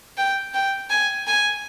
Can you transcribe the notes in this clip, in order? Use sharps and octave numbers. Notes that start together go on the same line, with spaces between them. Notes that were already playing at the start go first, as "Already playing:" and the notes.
G5
G5
G#5
G#5